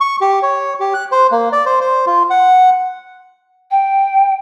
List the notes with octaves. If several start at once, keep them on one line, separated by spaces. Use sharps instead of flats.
C#6
G4
C#5
G4
F#6
C5
A#3
D5
C5
C5
F4
F#5
G5